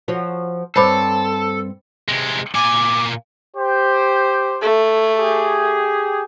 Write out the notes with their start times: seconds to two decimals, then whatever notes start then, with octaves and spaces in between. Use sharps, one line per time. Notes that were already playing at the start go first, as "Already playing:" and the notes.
0.08 F3 F#4 C#5
0.76 G2 C4 A4 C5 C#5 B5 D6
2.08 C3 G#3
2.55 A#2 G#5 D6
3.57 G4 C5
4.62 A3
5.16 G4 G#4